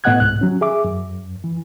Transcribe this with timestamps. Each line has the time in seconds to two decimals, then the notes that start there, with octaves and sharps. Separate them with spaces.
0.04 A2 B3 D#5 F#5 F#6 G#6
0.20 C2 G#2 F#6
0.41 F#3 C#4
0.61 G#4 E5 D6
0.85 F#2
1.44 E3